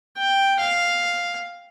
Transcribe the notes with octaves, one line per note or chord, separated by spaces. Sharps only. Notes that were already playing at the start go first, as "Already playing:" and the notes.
G5
F5